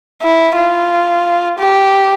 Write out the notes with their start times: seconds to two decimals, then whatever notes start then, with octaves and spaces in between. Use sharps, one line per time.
0.22 E4
0.56 F4
1.59 G4